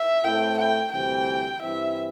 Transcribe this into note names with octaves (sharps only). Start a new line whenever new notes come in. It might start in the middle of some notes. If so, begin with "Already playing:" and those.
Already playing: E5
A2 A3 C4 E4 G5
G5
D2 C3 E3 G3 C4 G5
G2 E3 C4 E4 E5